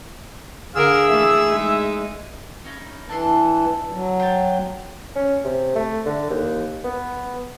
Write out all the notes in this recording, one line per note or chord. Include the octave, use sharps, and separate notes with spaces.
D3 G#4 A#4 F5 E6
E3 A3 E5
G#3 D#4
C#4 D#4 E4
E3 D4 A4 C6
F#3
C5 G5 A5
C#4
C3
A3
D3
D#2
B3